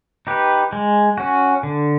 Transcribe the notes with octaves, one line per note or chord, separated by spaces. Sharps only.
D#4 G4 B4
G#3
C#4 F#4
D3